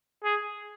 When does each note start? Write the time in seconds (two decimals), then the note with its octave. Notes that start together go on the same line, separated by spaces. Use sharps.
0.24 G#4